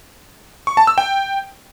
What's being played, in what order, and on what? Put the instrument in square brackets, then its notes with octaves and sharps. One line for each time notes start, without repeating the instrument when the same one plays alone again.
[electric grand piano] C#6
A5
E6
G5